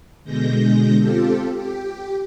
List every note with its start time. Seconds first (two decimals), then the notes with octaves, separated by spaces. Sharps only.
0.24 B2 D3 G#3 G6 A#6
0.99 C4 F4 G4 A4
1.54 G4